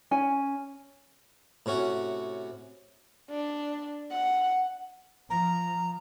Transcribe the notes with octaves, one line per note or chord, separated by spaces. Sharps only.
C#4 G#5
A2 C3 C#4 F#4
D4
F#5
F3 A#5